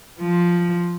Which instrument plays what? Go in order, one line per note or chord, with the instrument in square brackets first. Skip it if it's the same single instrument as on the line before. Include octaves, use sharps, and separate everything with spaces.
[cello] F3